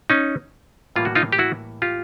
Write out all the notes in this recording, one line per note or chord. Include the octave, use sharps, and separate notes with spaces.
C#4 D#4
A2 E3 G3 A#3 F4
F#4
D#4 F4
G4
E4 F#4
F4 G4